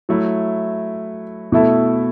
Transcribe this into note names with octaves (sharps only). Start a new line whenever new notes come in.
F#3 A3 E4
B2 A3 E4 A4